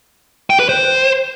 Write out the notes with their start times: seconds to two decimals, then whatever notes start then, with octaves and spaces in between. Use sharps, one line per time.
0.50 G5
0.59 B4
0.69 C5